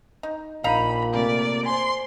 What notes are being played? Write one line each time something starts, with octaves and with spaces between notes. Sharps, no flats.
D#4
A#1 A#2 D#4 F5 A#5 B5 D#7
C3 A3 A#3 D5
C5 G#5 C6